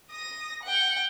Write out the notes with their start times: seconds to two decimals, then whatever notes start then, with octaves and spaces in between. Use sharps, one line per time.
0.11 D#6 A#6
0.63 F#5 G5